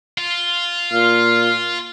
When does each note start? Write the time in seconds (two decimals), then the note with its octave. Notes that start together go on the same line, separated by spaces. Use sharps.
0.18 F4
0.92 A#2 F5